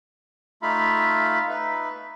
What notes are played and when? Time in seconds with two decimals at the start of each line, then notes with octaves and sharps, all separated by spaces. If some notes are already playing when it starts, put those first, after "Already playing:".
0.62 A3 D#4 F4 E5 F5 B5
1.49 D#4 B4 E5